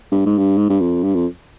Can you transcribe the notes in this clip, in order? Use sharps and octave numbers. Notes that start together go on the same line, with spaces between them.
G2
G#2
G2
G#2
G2
F2
G2
F2